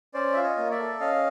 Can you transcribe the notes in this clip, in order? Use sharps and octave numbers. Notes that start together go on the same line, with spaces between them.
C#4 C5 D5
F4 E5
C#5 D#5
A#3
D5 E5
A4
C#4 D#5 F5